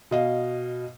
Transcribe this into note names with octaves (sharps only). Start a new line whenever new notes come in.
B2 D#5 F5